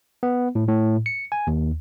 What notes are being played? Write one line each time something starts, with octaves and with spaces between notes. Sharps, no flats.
B3
A2
A2
C#7
G#5
D#2